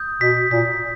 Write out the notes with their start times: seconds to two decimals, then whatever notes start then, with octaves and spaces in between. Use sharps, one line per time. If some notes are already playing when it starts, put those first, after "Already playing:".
Already playing: D#6 G6
0.20 B2 B6
0.50 A#2 B6